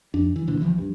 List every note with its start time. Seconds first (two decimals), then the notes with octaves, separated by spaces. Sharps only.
0.14 F2 D4
0.36 E3
0.47 C#2 A#2 D3 E3
0.61 C2 C#3 E3 F3
0.78 G2